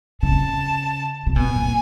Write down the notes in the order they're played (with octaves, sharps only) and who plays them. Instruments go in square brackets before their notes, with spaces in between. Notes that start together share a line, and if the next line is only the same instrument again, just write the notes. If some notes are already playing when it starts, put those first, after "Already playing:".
[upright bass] C#3 [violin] A5
[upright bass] C3
[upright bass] B2 [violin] G#5
[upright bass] A#2